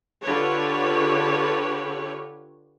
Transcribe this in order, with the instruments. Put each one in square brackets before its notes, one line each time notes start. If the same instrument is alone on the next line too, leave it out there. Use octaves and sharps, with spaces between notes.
[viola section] D3 F4 G4 B4 C#5